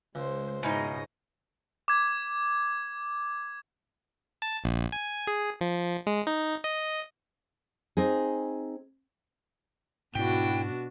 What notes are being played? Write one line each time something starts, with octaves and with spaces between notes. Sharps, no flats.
C#2 G#3 C5
G#2 B2 C#4 D#4 E4 D#5
D6 G#6
A5
A#1
G#5
G#4
F3
G#3
D#4
D#5
C4 D#4 G#4
G#2 B2 D4 E4 F#4 G5